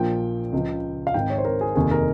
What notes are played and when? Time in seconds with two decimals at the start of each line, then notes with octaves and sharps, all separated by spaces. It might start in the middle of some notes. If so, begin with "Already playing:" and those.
Already playing: A#1 A#2 F3 G5
0.53 C#2 C#3 F3
1.07 F5
1.14 G#1 G#2 D#3 G5
1.30 C#5
1.38 C5
1.45 A#4
1.61 G#4
1.75 F1 D#2 D#3 G#4
1.91 A#4